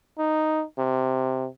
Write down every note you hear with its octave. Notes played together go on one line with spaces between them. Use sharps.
D#4
C3